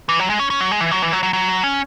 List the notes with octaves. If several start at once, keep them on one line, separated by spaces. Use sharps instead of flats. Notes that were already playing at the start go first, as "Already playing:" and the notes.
E3
F#3
G#3
C#4
C#4
F#3
G#3
E3
F#3
E3
F#3
F#3
F#3
C#4